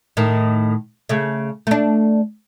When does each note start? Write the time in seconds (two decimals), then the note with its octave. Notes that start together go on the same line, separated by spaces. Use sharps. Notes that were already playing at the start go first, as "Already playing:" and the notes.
0.17 A2 D#3
1.09 C#3 A3
1.67 A3 D4